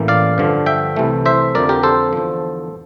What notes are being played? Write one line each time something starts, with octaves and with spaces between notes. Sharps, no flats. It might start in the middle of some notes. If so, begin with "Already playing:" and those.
Already playing: A1 A2 E3 A#3
D5 F5
G2 D3 F3
E5 G5
C2 C3 E3 A3
C5 E5
F2 D3 F3 A#4 D5
G4 A#4
A4 C5
E2 D3 F3